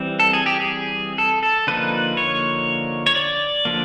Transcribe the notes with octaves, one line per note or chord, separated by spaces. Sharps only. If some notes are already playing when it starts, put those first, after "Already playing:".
Already playing: E3 G3 C4
A4
G#4
G4
G#4
A4
A4
D3 F3 A#3 D#4 B4
C#5
C#5
D5
D3 F3 A#3